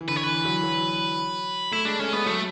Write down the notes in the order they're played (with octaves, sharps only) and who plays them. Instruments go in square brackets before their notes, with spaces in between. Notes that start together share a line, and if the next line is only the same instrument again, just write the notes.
[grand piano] E3
[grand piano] D3 [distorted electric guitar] B4
[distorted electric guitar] C#5
[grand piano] E3 [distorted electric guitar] B4
[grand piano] F#3
F#3
[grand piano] A3 [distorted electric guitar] E4
[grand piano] G#3 [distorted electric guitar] D4
[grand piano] A3 [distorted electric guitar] C#4
[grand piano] G#3 [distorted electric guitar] B3
[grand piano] F#3 [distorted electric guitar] A3